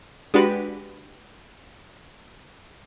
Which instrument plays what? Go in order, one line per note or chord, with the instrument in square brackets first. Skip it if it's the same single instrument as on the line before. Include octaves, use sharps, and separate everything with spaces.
[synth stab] G#3 D4 F#4 G4 B4